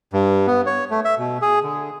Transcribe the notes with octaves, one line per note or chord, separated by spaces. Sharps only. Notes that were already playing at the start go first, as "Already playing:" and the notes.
G2
B3
C#5
A3
E5
B2
G#4
D3